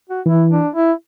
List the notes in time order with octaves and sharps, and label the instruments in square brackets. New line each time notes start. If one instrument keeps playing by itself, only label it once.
[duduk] F#4
[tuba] E3 [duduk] E4
[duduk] D4
E4